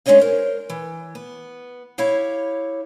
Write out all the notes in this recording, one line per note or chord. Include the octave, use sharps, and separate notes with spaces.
G#3 C#4 D4 C#5 D#5 F5
A#4 C5
E3
B3
E4 G4 C#5 F5